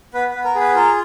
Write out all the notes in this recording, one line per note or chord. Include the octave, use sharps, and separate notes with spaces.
B3 B4
B3 B4
A#4
G#4
B4
F4 A#4